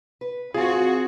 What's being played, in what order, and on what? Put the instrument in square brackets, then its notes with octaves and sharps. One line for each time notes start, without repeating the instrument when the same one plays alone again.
[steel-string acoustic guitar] B4
[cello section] C4 F#4 [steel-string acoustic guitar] F4 [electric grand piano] G#4 G#5